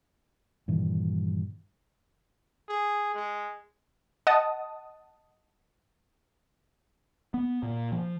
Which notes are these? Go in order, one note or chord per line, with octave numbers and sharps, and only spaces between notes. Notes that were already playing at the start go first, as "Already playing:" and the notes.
G2 A#2 D#3 E3
G#4
G#3
D#5 F#5 A5 D#6
B3
A#2
F3